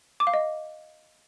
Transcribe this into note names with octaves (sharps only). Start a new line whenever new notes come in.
D6
F5
D#5